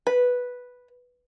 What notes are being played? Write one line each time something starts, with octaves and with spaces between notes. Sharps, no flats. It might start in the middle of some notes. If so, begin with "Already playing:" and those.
B4